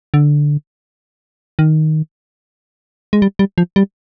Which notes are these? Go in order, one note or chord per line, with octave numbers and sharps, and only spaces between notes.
D3
D#3
G#3
G3
G3
F3
G3